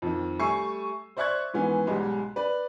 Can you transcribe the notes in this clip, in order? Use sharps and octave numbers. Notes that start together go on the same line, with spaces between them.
F2 D#3
G3 A3 G#5 C#6 E6 C7
C5 D5 E5 C#6 F#6 G#6
G#2 D#3 E3 B3 C#4
B1 G#2 G3 G#3
B4 D5